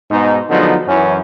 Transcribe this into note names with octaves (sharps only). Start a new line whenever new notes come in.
G#2 B2 D#4
D3 F3 F#3 G#3 B3 D#4
F#2 E3 C#4